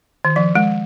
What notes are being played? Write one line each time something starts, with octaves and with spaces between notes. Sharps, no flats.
D#3
F3
G#3